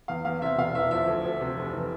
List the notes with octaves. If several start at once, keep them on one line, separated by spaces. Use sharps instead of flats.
E2 F5
E2 F5
C3 E5
E1 F5
E3 E5
F3 E5
D2
D2
C3
F1
E3